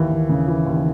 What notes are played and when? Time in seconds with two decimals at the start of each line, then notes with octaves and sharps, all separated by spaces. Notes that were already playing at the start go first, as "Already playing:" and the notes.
Already playing: D#2 E3
0.11 D#2
0.29 C#3
0.48 E3
0.66 D#2